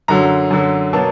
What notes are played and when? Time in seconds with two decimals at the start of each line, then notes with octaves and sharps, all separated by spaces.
0.08 F#2 D3 F#3 A#5
0.51 F#2 D3 F#3
0.93 B2 F#3 A#3 A5